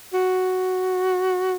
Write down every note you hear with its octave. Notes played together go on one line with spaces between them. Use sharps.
F#4